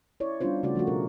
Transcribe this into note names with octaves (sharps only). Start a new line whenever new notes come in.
E4 C#5 D5
G3 B3 C#4 D4 F4 C5
C#3 A3 F#4 D5
F3 A3 F#4
B2 G#4 A#4